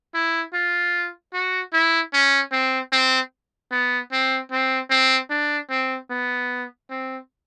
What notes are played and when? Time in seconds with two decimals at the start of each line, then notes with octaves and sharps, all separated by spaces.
0.14 E4
0.54 F4
1.33 F#4
1.73 E4
2.13 C#4
2.52 C4
2.92 C4
3.71 B3
4.12 C4
4.52 C4
4.90 C4
5.30 D4
5.70 C4
6.10 B3
6.90 C4